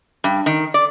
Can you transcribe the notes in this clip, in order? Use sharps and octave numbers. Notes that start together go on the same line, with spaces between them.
G2
D#3
D5